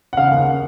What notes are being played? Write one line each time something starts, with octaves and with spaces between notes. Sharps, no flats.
F#5
C#3 F5
D#2 F#5